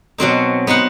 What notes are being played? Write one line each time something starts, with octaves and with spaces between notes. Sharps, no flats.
B2 F#3 C4 D#4
B3 D#4 C5 F#5